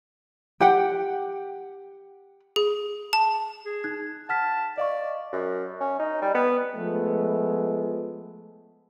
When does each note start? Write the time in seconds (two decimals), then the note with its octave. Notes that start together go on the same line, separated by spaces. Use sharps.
0.60 G4 F#5 G5
2.56 G#4
3.13 A5
3.65 G#4
3.84 D#4 F#6 G#6
4.29 F#5 A5 F6 B6
4.78 D5 D#5 F5 C#6
5.33 F#2
5.80 C#4
5.99 D#4
6.22 G3
6.35 B3
6.76 F3 G#3 A3 B3